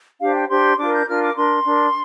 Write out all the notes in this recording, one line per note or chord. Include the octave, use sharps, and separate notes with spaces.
D4 G4 C5 F5
G5
D4 G4 C5 C6
D4 F4 A#4 D6
G6
D4 F4 A#4 F6
D6
D4 A#4 C6
D4 A#4